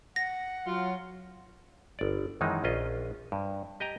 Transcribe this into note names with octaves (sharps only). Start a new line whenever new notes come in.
F#5 A#6
F#3 F4
G1 D5
F#2 D#3 E3 G#3 D#4
A#1 C#4 F4 D#5
G2
G4 D#5 G5 G#5 A#5